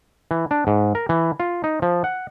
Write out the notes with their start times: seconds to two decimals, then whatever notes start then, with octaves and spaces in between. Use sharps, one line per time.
0.31 E3
0.51 D4
0.67 G#2
0.95 A#4
1.09 E3
1.40 F4
1.64 D#4
1.82 F3
2.04 F#5